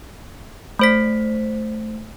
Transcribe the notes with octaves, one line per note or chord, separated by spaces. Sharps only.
A3 C5 B6